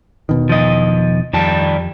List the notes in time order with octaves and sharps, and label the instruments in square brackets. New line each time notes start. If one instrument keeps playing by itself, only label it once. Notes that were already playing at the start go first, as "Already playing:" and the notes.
[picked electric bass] E1 B2 D#3
[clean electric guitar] F3 D#5
[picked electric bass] F2 [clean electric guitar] D#3 G3 A5